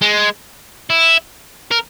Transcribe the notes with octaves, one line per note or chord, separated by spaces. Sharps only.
G#3
E4
A#4